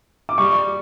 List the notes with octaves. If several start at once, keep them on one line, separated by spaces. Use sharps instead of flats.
D6
G3 C#6